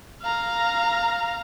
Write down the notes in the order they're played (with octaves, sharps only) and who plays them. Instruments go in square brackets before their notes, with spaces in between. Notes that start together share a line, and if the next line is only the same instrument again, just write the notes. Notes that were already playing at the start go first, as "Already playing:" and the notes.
[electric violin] F5 A#5